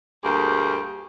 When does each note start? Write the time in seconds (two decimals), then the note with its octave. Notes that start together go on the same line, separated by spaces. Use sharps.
0.24 D2 G2 A#3 G4 G#4